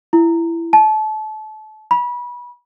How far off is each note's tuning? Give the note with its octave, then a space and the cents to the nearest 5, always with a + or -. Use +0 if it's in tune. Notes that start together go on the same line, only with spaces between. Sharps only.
E4 +20
A5 -30
B5 -25